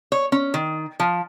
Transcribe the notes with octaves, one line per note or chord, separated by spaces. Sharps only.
C#5
C#4
D#3
F3